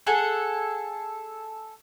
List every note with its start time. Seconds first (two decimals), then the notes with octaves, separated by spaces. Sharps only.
0.07 G#4 A4 F#5 G#5